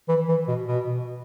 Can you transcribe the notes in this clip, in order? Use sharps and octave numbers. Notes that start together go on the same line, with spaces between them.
E3
E3
B2
B2